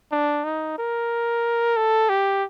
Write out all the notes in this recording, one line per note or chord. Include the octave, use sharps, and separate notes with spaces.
D4
D#4
A#4
A4
G4